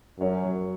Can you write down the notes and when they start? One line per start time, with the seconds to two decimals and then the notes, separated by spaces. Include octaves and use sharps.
0.20 F#2 C#5
0.44 F#3